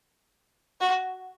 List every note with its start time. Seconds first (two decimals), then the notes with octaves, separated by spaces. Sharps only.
0.81 F#4